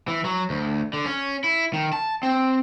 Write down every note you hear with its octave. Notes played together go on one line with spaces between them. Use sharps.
E3
F#3
D2
D3
C#4
E4
D#3
A5
C4